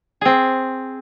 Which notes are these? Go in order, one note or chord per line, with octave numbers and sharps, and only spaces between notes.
C4 G#4